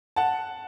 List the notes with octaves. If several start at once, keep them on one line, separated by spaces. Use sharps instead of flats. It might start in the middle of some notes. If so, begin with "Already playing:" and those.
F#5 A5